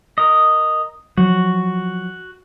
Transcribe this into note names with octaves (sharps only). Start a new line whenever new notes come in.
A#4 D#5
F3 F#3 F#4